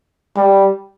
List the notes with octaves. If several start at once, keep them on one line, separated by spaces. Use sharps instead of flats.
G3